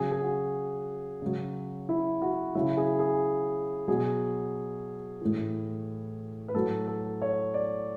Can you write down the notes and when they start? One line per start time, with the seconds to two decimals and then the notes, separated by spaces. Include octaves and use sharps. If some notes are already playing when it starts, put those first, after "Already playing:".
Already playing: C#3 F#3 G#4
0.12 G#4
0.21 F#4
1.22 C#3 F#3
1.89 E4
2.22 F#4
2.55 C#3 F#3 E4
2.77 G#4
2.99 G#4
3.88 B2 F#3 G#4
5.21 A2 E3
6.48 B4
6.54 A2 F#3 A4
6.87 A4
7.22 C#5
7.54 D5